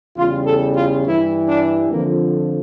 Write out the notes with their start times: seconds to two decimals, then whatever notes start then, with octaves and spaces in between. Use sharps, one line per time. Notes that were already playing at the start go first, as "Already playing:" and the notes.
0.17 E2 C#3 G3 F4
0.46 A4
0.75 F4
1.04 G2 E3 G3 E4
1.48 D4
1.91 F2 D3 F3 A#3